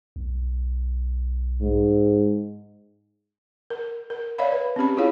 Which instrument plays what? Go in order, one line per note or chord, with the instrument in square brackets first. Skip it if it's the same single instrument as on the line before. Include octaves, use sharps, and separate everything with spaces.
[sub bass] B1
[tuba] G#2
[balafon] A#4
A#4
C#5 D5 E5 F5 B5
B4
C4 C#4 G4 B5
E4 F4 G#4 C#5 F5